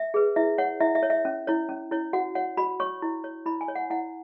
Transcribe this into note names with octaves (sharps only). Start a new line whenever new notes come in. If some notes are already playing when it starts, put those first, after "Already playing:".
Already playing: E5
G#4 B4
E4 E5
C#5 F#5
E4 E5
E5
C#5
E5
C#4
E4 C#5
C#4
E4 C#5
F#4 F#5
C#5 F#5
F#4 B5
C#5 C#6
E4
C#5
E4 B5
G#5
C#5
F#5
E4 F#5